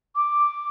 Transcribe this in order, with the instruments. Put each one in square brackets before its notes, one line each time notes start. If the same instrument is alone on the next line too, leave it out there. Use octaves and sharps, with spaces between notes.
[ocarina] D6